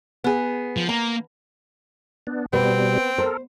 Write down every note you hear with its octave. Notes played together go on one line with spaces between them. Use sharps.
B3 G#4
F3
A#3 A#5
B3 D4
B2 G3 B3 C4 B4
A4 A#4 C5